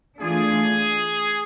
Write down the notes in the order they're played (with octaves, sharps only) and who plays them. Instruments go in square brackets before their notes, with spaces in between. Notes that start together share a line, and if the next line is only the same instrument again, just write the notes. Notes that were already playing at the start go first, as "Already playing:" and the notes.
[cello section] E3 A3 D4 F4 [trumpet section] G#4